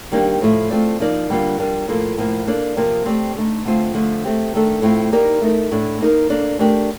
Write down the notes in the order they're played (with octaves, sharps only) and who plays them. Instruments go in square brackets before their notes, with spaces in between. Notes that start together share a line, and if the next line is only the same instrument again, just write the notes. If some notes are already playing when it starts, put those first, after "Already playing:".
[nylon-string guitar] D#3 G3 A#3 D4 G4
A2 F3 A3
A3 C4 F4 A4 D5
F3 A#3 D#4 A#4 D5
D3 G3 A#3 D4 F4
G3 D4 F4 A#4
A2 F3 A#3 F4 A4
A2 F3 A#3
A#3 D4 A4 D5
C3 F3 A#3 F4 A#4
A3 C4 G4 D5
D3 A3 D#4
D3 A3 C4 F4 C5
D3 F3 A3
A3 C4 G4
D#3 A3 D4 A4
A2 A3 C4 F4
A#3 D#4 G4 A#4 D5
A3 D#4 A#4
A2 A3 D4
A#3 D#4 A#4
A#3 D4 A4 D5
A3 D4 G4 A#4 D5